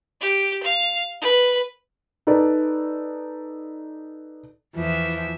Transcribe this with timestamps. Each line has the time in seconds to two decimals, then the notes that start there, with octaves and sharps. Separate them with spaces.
0.21 G4
0.63 F5
1.22 B4
2.27 D#4 A4 B4 D5
4.75 E2 E3 F3 E5